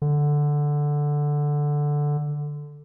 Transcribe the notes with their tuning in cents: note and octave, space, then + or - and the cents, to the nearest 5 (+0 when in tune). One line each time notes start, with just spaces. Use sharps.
D3 +0